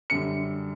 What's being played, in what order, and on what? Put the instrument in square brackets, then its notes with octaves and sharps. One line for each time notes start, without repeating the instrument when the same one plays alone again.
[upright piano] F#2 D3 G3 C#7